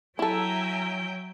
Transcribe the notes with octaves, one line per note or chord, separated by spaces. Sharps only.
F#3 E4 A4 E5 G5 G#5 A#5